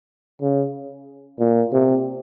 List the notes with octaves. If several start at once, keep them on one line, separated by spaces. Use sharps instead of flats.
C#3
A#2
C3